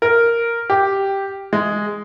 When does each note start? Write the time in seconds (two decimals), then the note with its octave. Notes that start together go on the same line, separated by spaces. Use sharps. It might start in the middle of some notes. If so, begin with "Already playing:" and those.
0.02 A#4
0.70 G4
1.53 G#3